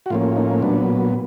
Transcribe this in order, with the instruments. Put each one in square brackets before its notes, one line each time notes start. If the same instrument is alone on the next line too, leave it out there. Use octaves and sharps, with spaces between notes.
[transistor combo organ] F#4
A2 F3 A#3 C#4 F4
D#4
A#2 F#3 B3 D4